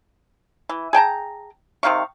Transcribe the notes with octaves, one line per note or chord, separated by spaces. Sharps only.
E3
G#4 G5 A5 A#5
C3 D#3 F5 C#6